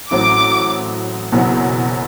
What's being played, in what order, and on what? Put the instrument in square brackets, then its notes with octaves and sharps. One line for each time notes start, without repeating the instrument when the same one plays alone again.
[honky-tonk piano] A1 A2 F#3 C4 [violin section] D6
[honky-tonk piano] F#1 E2 B2 F#3 C4